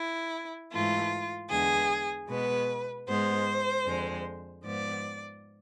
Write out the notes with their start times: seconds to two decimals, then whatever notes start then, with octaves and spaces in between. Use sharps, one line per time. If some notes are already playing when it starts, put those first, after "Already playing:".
Already playing: E4
0.71 G#2 E3 A3 F4
1.50 E2 D3 G#3 B3 G#4
2.28 B2 G#3 B3 B4
3.07 G#2 G#3 B3 C5
3.85 F2 D3 G#3
4.64 G#2 F3 B3 D5